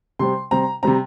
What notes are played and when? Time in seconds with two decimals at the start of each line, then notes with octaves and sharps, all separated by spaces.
0.19 C3 G3 C4 C6
0.51 C3 G3 C4 A#5
0.83 C3 G3 C4 A#5